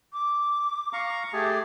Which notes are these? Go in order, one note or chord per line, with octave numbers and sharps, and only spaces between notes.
D6
F5 A#5 C#6
A3 G4 G#4 A5 D6